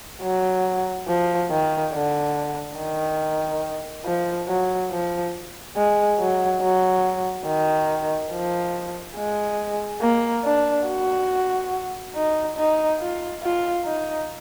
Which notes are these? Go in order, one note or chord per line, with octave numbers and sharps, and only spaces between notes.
F#3
F3
D#3
D3
D#3
F3
F#3
F3
G#3
F#3
F#3
D#3
F3
G#3
A#3
D4
F#4
D#4
D#4
F4
F4
D#4